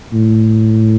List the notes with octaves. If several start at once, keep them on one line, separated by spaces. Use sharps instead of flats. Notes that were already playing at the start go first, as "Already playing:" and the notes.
A2